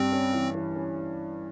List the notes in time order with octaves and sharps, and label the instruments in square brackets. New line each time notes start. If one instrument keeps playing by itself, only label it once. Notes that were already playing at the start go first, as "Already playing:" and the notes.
Already playing: [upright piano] G2 G3 [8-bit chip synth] C4
[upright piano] C#4
E3
E3
C#4